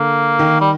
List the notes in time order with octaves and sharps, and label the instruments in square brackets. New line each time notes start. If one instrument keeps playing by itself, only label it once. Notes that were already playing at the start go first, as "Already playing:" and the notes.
Already playing: [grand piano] D3 [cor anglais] A#3
[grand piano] D#3
[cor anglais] G3